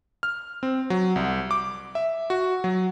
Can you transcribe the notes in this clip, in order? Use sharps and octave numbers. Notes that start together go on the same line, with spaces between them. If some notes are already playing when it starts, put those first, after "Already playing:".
F6
C4
F#3
C2
D6
E5
F#4
F#3